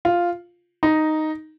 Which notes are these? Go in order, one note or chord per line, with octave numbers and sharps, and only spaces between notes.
F4
D#4